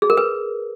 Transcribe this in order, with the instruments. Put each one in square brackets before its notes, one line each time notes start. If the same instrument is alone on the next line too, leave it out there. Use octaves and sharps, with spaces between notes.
[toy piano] G#4
A#4
B4